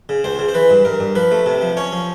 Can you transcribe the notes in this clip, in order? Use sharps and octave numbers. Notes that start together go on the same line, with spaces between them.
C#3
C#2 C5
C#3
C5
E3 B4
G2
G2 A#4
G2
F3 B4
A3
C3
F3
C#4 C#5
F3